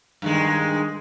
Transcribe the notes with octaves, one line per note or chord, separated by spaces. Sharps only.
G2 D#3 G#3